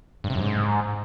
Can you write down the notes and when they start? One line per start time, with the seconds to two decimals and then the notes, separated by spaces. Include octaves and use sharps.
0.24 G2
0.30 C3
0.36 F#2
0.41 G#2